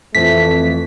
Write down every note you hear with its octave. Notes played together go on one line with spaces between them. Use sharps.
F2 E3 F3 A3 B6